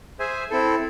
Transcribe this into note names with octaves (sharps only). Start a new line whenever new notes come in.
G#4 C5 E5 G#5
C4 E4 A4